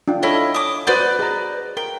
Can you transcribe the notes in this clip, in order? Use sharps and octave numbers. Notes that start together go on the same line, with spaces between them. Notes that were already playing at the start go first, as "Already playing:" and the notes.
D4 F4 G5
E4 A4 C#5 D#5 F5
D6 D#6
F#4 B4 C5 D5 F#5 G6
G#4 D#5 A#5
A#4 G5